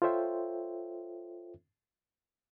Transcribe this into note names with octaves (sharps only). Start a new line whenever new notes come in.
F4 A4 C5 C#5 E5 G5